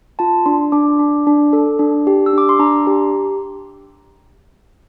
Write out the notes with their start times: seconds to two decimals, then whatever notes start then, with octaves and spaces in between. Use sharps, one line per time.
0.19 F4 A5
0.46 D4 C6
0.72 D4 D6
0.99 D4
1.27 D4
1.53 A4
1.79 D4
2.07 G4
2.26 E6
2.33 D4 D6
2.49 C6
2.59 D4 A#5
2.87 G4